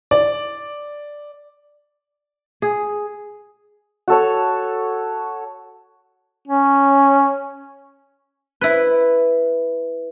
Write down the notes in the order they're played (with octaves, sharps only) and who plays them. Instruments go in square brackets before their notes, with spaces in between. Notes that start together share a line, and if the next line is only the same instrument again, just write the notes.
[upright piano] D5
[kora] G#4
[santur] F#4 A4 C#5
[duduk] C#4
[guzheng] E4 B4